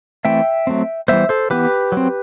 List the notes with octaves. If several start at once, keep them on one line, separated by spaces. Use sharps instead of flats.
E3 A3 C4 E5 G5
F#3 A3 C4
E3 G3 B3 C5 E5
A4 C5
E3 B3 G4 B4
F#3 C4